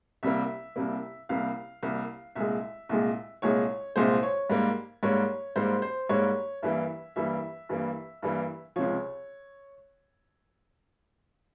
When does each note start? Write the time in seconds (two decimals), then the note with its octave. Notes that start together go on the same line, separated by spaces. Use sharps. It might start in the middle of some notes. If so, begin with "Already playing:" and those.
0.23 C2 C3 G3 A#3 E5
0.76 C2 C3 G3 A#3
1.29 C2 C3 G3 A#3 F5
1.83 C2 C3 G3 A#3
2.35 C2 A#2 G#3 E5
2.89 C2 A#2 G#3
3.42 C2 A#2 G#3 C#5
3.96 C2 A#2 G#3 C5
4.23 C#5
4.50 G#2 G3 A#3
5.03 G#2 G3 A#3 C#5
5.56 G#2 G3 A#3 C5
5.82 C5
6.09 G#2 G3 A#3 C#5
6.63 G2 E3 G3 A#3 E5
7.16 G2 E3 G3 A#3 E5
7.69 G2 E3 G3 A#3
8.23 G2 E3 G3 A#3
8.76 C#2 C3 F3 C#5